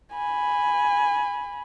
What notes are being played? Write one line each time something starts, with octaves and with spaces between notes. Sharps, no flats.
G#5 B5